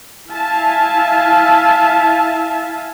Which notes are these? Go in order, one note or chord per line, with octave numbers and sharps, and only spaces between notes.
E4 E5 F5 G#5 A5